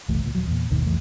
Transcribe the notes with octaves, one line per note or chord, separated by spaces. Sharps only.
F#1 C2 E3 A3
C#2 A#2
D#1 F3 F#3
E2 A#2
G1 D#2 B2 D#3
C2 F2 E3 A3